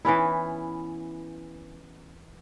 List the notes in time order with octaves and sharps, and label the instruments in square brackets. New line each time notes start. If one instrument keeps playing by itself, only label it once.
[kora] E3 B3 C#4 E4